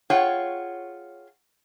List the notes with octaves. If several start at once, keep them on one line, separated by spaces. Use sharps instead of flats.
F4 G#4 C#5 F#5 G5